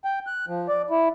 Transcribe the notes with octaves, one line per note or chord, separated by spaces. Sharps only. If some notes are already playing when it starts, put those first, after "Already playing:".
G5
F#6
F3
D5
E4